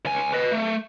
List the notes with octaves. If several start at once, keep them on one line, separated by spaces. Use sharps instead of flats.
C#2 G#5
B4 D#5
A3